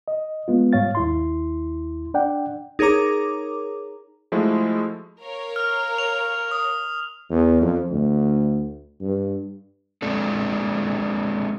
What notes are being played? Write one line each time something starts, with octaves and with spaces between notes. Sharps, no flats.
D#5
G#3 B3 F4
G#2 G3 C#5 F5 A6
D#2 E4 C6
D4 D5 F#5 G5
D#4 G#4 A#4 C#5 A#5 D6
F3 G#3 A3 E4 F#4
A#4 C#5 F5
F6
F7
D#6
E2
F2
D2
G2
G#3 C4 D4 A4